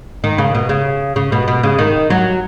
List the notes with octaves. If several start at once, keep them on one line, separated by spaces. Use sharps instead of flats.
D#3
C#3
B2
C#3
C#3
B2
B2
C#3
D#3
F#3